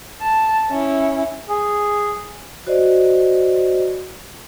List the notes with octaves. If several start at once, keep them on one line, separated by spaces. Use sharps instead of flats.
A5
C#4 E4
G#4
F#4 C5 D5 D#5